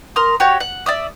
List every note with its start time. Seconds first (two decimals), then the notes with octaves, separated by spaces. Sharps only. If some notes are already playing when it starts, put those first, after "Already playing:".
0.16 A#4 C6 D#6
0.40 F#4 G4 C#5
0.60 F#5
0.86 D5 E5 D#6